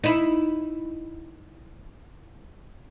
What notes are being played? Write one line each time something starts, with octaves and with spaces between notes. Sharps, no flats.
D#4 E4